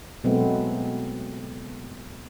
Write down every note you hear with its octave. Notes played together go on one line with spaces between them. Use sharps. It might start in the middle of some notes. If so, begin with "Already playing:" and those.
B2 F#3 G#3 A3 B3 C4